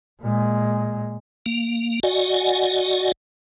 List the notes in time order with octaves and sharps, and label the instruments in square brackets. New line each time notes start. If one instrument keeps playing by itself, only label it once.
[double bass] A#2 G#3
[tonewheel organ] A#3
F#4 D5 D#5 F#5 G#5